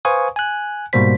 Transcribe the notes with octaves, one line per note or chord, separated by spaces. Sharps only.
B4 C5 F5 G#5 C#6 D#6
G#5 F#6
G#2 B2 G3 A#3 C5 B6